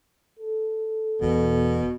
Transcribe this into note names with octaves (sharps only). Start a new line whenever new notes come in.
A4
E1 B2